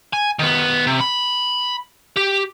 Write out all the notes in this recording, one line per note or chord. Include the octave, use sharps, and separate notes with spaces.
G#5
D#3 B3
C3
B5
G4